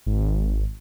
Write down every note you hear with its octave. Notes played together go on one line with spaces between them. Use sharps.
G#1